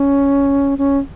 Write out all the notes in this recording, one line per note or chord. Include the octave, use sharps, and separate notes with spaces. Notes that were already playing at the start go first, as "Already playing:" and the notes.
Already playing: C#4
C#4